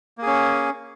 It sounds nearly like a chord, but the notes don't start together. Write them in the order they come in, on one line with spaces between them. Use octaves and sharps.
A#3 G#4 C#4